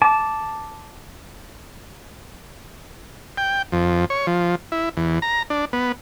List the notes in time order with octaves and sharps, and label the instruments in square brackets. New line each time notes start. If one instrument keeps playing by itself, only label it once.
[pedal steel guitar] A5 D6
[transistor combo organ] G5
F2
C#5
F3
E4
E2
A#5
D4
B3